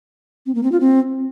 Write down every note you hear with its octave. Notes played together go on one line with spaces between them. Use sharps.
C4
A#3
C4
F4
C4